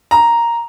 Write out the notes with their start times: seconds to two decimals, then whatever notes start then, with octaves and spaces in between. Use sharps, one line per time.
0.11 A#5